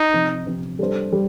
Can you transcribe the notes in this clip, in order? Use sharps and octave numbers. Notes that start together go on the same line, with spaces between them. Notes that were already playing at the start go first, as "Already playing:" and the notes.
Already playing: D#4
C3 F3 C4
C3 F3 C4
G3 D4 A4 C5
G3